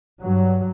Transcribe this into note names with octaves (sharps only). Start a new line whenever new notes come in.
G2 F#3